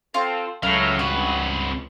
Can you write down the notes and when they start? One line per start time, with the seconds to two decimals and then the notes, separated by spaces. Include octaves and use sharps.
0.14 C4 F4 A4
0.63 C#2 A2 F#3 F5
0.99 C2 G2 F#4 B4